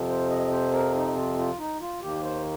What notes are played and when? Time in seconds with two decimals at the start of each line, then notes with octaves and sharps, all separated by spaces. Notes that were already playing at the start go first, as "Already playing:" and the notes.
Already playing: F2 C3 F3 C4
0.09 C5
0.30 D#5
0.51 C5
0.73 A#4
0.94 D#4
1.16 F4
1.38 F4
1.58 D#4
1.81 F4
2.01 D#2 D#3 A#3 G4
2.23 C5